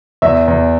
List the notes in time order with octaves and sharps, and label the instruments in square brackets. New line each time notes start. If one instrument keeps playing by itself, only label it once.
[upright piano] E2 E5
E2